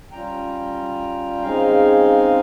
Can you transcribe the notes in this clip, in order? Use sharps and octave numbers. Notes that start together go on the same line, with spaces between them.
G3 C#4 F4 G5 A#5
C#3 G#3 C4 D#4 F5 G#5